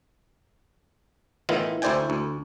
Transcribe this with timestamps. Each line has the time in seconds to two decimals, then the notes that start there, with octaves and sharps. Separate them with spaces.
1.49 A2 D#3 E3 B3 E4 F4
1.82 D2 E4 C5 D5 G5 G#5
2.10 D2